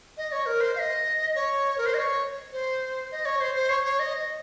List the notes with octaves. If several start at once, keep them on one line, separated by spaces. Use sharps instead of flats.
D#5
C#5
A#4
C5
F5
D#5
C#5
A#4
C5
D#5
C#5
C5
D#5
C#5
C5
C5
C#5
C#5
D#5